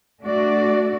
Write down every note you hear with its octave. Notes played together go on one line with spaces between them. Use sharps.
A3 D4 F#4 D5